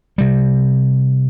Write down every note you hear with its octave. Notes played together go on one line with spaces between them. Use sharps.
C3 G3